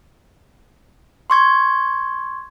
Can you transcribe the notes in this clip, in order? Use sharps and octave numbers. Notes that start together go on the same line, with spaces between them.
C6 C#6 G#6